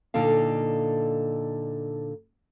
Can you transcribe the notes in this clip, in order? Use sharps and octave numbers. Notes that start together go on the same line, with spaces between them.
A#2 D3 D#4 A4 F5